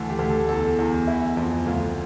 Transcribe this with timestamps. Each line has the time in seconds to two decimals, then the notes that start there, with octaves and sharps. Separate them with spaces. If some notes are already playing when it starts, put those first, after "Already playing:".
Already playing: D2 E3 A4
0.10 G4
0.19 D2
0.30 A4
0.49 E2 A4
0.79 E2
1.07 E3 E4
1.37 F2
1.66 D2 F4